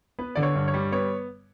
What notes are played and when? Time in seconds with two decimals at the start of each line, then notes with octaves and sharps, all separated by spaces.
0.19 B3 B4
0.36 D3 D5
0.43 C#5
0.55 G2
0.68 C#5
0.74 G3
0.92 B3 C#5